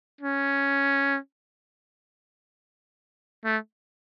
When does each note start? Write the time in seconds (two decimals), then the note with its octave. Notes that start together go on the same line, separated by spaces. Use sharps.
0.21 C#4
3.45 A3